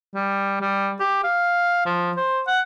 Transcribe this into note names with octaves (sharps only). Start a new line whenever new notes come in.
G3
G3
G4
F5
F3
C5
F#5